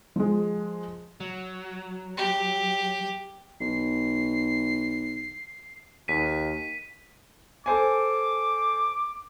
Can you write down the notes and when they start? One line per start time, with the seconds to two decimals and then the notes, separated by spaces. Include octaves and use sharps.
0.16 F3 G#3
1.20 F#3
2.17 G4
3.60 B1 C7
6.08 D#2 B6 D#7
7.66 A4 C5 G#5 D6